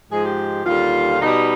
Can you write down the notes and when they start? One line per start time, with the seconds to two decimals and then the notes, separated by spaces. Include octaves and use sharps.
0.10 G#2 F3 G#3 G#4
0.23 G4
0.65 D#2 D3 G3 F4
1.22 B2 G3 D#4